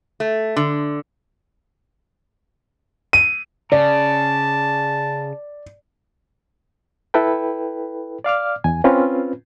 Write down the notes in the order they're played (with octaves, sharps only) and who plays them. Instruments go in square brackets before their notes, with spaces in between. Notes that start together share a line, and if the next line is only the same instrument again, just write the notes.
[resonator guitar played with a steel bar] A3
D3
[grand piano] D#7
[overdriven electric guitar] C#3 [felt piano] D5 [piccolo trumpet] A5
[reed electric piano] E4 A4 B4 G5
D5 F5 D6 F6
E2 G#5
C4 C#4 F4 B4